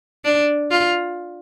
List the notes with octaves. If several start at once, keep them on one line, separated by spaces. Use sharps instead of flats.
D4
F4